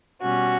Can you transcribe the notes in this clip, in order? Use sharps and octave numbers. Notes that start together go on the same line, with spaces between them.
B2 G3 C#4 F#4